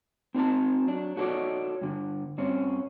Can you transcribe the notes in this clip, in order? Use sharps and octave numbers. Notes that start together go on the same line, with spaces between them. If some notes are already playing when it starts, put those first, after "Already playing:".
C4 D#4 A#4 A5
F#3 D4
D#4 F#4 A4 B4 C#5 D5
G2 D3
G2 C4 C#4